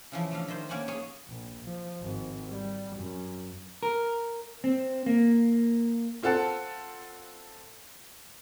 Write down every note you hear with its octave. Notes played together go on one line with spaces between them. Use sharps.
C#3 E3 F3
A3 D4 F5
D#3 C5
A#3 C#4 D5 F#5 G#5
G#4 C#5 G#5
A#1
F3
G#1
G3
F#2
A#4
C4
A#3
C4 F4 A4 F#5 A5